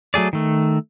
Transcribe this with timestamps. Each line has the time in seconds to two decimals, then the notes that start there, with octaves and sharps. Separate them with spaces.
0.14 F#3 A3 G#4 D5
0.33 D#3 A3